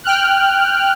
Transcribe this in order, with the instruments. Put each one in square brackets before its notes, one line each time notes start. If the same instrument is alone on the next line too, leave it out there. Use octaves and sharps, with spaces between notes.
[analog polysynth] G5 F6 F#6